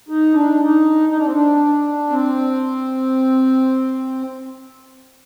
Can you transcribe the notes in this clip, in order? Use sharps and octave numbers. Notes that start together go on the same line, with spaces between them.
D#4
D4
D#4
D#4
D4
C4
D4
C4